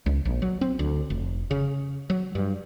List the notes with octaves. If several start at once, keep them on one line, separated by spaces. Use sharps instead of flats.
C#2
A#1
F#3
C4
D2
F1
C#3
F#3
G2